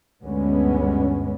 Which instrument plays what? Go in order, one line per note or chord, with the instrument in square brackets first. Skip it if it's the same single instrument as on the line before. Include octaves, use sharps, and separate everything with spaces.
[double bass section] D2 G2 D3 G#3 B3 C#4